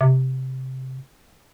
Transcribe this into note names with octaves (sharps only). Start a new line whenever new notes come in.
C3